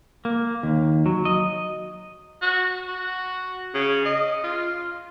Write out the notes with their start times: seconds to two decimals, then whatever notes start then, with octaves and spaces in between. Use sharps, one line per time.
0.25 A#3
0.63 D#2
1.06 F#3
1.25 D#5
2.42 F#4
2.88 F#4
3.75 C#3
4.06 D#5
4.44 F4